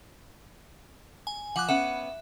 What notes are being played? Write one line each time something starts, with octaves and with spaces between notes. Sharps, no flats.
G#5
F3 F#5 D6 F#6
B3 C#4 E5 F#5